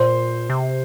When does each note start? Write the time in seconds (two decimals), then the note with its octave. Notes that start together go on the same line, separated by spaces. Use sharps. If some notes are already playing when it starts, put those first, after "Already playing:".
Already playing: A#2 C5
0.50 C3